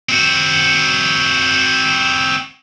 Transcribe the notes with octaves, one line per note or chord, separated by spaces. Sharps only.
C4 F#4